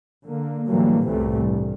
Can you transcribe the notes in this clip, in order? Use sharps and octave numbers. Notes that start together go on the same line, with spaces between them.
D3 A#3
A2 D3 E3 F#3 G3 A#3
C2 F#2 A2 C3 E3 A3
G2